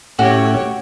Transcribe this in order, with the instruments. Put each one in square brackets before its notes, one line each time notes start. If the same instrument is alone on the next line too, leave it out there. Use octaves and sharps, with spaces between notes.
[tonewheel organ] A2 A3 C#4 [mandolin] F#4 [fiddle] G4 C#5